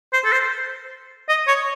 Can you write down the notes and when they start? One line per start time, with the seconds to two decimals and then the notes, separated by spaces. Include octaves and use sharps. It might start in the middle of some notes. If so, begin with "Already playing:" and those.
0.13 C5
0.25 A4
0.32 C5
1.29 D#5
1.48 C#5